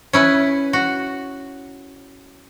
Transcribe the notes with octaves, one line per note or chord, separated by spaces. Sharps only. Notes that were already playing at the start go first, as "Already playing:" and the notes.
C#4 E4 B4
F#4